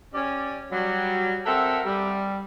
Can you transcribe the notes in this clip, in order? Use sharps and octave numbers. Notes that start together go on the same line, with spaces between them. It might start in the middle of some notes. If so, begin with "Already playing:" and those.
C#4 G4 D5
F#3 G3
C4 A4 A#4 E5 F#5
G3